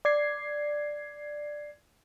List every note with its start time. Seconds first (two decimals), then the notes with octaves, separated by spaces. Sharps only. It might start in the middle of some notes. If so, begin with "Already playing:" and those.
0.05 D5 G#6 C7